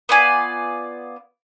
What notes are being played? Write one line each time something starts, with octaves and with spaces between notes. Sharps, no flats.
B3 F4 D5 G#5